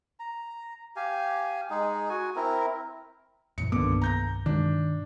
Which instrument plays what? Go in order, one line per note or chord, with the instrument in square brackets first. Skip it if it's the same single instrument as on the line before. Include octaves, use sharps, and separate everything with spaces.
[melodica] A#5
G4 F5 G#5
G#3 D#4 G#4
F#4 G#5
C4 E4 A#4
[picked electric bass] F#2 A#2 E3 [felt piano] C#7
[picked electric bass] C2 G2 D#3 [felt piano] D3 D6 [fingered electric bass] A#3 B3
[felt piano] A#5 G6 A#6
[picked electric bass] G2 B2 G#3 [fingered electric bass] D#3 [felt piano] D4